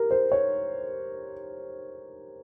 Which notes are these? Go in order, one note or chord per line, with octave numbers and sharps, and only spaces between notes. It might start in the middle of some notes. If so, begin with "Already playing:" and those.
Already playing: G4 A#4
C5
C#5